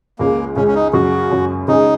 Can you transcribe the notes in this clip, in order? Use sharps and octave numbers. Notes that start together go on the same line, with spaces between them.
C#2 C#3 G#3 A#3
C#2 C#3 G#3 C#4
C#4
D#4
F#2 C#3 F#3 F#4
F#2 C#3 F#3
C#3 G#3 C#4 D#4 G#4